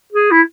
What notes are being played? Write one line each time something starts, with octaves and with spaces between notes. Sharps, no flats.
G#4
E4